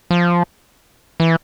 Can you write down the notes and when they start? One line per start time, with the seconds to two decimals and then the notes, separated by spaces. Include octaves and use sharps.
0.11 F3
1.20 E3